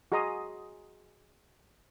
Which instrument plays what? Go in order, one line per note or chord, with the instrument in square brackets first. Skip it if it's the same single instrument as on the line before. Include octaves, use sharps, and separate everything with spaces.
[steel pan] F#4 G#4 D#5 A#5 C6 D#6